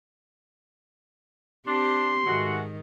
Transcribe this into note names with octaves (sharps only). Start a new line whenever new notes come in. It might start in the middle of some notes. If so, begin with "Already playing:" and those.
C4 D4 G4 C6
G#2 D#3 G#3 A3 F#4